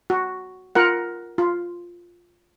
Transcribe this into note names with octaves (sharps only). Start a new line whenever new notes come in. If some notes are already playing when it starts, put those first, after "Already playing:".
F#4
F4 A#4 F#5
F4